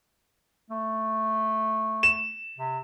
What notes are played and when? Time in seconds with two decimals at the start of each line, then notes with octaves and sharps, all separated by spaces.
0.70 A3
2.03 E7
2.59 C3